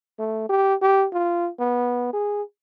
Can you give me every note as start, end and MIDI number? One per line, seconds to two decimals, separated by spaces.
0.19 0.48 57
0.49 0.75 67
0.82 1.06 67
1.13 1.50 65
1.59 2.11 59
2.13 2.43 68